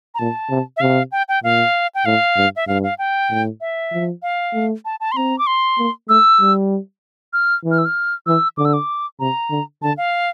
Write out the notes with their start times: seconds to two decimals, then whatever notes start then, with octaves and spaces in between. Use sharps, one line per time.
0.15 A#5
0.19 A#2 A5
0.50 C3
0.77 E5
0.81 C3 F5
1.12 G5
1.29 G5
1.44 A#2 F5
1.95 G5
2.05 A2 F5
2.37 G2
2.56 E5
2.67 G2 F5
2.83 F5
2.99 G5
3.30 A2
3.61 E5
3.92 F3
4.22 F5
4.54 A3
4.85 A5
5.00 A5
5.12 C6
5.16 C4 A#5
5.39 D6
5.47 C6
5.78 A#3
6.09 A3 E6
6.40 G3
7.33 F6
7.64 E3
7.71 F6
7.78 E6
7.85 F6
8.26 E3 E6
8.57 D3 D6
8.65 E6
8.73 D6
9.20 C3 A#5
9.50 D3
9.82 D3 A5
9.97 F5